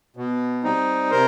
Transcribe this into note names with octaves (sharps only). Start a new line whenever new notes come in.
B2
G3 C4 D#4
C3 A#4 C5